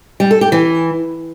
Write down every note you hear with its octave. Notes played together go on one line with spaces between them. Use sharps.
G3
A4
G4
E3